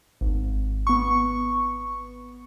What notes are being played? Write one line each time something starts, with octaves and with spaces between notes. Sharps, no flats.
G#1
B3 C#6